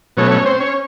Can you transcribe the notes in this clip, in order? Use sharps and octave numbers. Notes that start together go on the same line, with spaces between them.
B2 F#3 A3 C#4 C#5
C#4 C#5
C4 C5
C#4 C#5